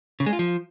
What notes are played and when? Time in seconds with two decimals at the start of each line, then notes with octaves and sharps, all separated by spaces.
0.20 C#3
0.26 G#3
0.33 F4
0.39 F3